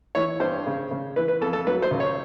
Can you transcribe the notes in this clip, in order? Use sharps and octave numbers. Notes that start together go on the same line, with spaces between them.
E3 C#5
G2 C5
C#3
C#3
E3 B4
B4
F2 A4
A4
F#3 B4
C5
C#2
C#5